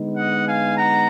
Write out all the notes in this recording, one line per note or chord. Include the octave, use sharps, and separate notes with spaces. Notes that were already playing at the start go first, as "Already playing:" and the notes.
Already playing: D3 G#3 B3 D#4
D#5 F#5
F5 G#5
F#5 A#5